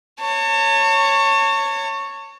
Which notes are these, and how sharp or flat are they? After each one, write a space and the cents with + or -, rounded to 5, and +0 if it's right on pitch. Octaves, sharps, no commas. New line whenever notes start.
C#5 +0 A5 +40